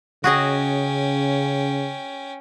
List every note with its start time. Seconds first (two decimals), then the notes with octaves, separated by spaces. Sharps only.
0.24 C#3 C#4 F#4 G#4 D#5 G5